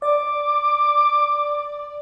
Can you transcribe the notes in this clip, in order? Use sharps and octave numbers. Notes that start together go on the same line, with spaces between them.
D5 D6